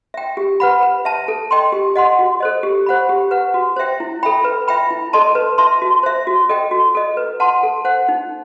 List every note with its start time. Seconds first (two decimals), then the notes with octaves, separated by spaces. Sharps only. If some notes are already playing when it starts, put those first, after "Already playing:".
0.14 E5 G5
0.37 G4
0.60 B4 F#5 B5
0.83 B4
1.05 E5 A5
1.28 A4
1.51 D#5 G5 C6
1.72 G4
1.96 D#5 F#5 C6
2.19 F#4
2.40 A4 C5 D#5
2.63 G4
2.86 C5 F#5 B5
3.09 G4
3.31 B4 F#5
3.54 F#4
3.76 C5 E5 G5
4.00 E4
4.23 A4 E5 G5 B5
4.44 B4
4.68 E5 G5 B5
4.90 E4
5.13 A4 D#5 A5 C6
5.35 B4
5.58 E5 A5 C6
5.82 F#4
6.03 C5 E5
6.27 F#4
6.49 A4 D#5 G5
6.71 F#4
6.95 A4 D#5
7.17 B4
7.40 F#5 A5 C6
7.63 A4
7.85 C5 F#5
8.08 D#4